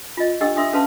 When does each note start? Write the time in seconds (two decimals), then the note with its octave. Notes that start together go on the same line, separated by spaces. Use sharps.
0.17 F4 D#5
0.41 D4 G4 A4 D#5 F#5 E6
0.56 D4 A4 E5 C6 D#6 E6
0.73 C#4 A4 B4 F5 A5 C6